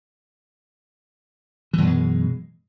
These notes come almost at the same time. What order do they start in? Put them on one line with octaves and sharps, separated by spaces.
E3 F#2 B2 G#3